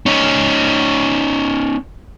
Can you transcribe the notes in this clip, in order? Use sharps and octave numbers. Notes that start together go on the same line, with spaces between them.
C#4 D#4